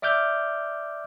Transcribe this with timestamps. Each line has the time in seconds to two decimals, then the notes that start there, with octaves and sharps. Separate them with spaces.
0.02 D5 E5 D6 F6 G6